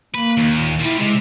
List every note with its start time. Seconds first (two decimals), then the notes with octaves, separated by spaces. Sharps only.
0.15 A#3 B4
0.37 D#2
0.55 A#2
0.80 G3 E4 F4
0.99 C3 G#3